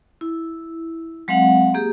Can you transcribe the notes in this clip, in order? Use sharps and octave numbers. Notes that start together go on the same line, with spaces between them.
E4
F#3 G#3 C4 F5 F#5
A#3 G4 G#4